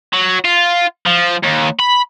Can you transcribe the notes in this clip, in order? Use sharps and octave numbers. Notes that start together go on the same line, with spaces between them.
F#3
F4
F3
D#2
B5